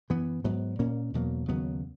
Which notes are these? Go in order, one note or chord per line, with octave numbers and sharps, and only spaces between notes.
F#2 E3 B3
G#2 F#3 B3
A#2 A#3 C#4
E2 B2 F#3 A#3
D#2 C#3 F#3 B3